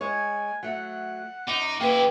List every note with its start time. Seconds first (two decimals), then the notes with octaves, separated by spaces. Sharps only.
0.01 G#3 C#5 G#5
0.63 F#3 A3 F#5
1.48 F#2 D#4 F#5 D6
1.80 F#2 C#3 A#3 E4 B4 G5